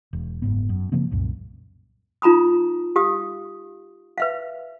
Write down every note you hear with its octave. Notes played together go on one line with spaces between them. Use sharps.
E1
F#1 G#2 B3
F#2
C#3 F3 A#3 C4
C2 F#2 A#2
D#4 F4 A#5 B5 D#6
G4 F5 D#6
B4 E5 F5